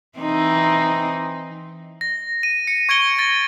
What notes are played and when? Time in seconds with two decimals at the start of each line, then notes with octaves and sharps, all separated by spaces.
0.19 E3 C4 D#4
2.01 A#6
2.43 D#7
2.67 C#7
2.89 C#6 G#6 C#7 D7 G7
3.19 A6 A#6